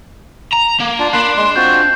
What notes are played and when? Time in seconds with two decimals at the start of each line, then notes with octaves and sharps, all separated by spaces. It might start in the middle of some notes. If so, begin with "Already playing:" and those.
0.52 A#5
0.80 A#3
0.99 D4 F4
1.13 A#3 D4 B5 C6 F#6 C7
1.37 G#3 C6
1.56 C4 F4 F#4 G6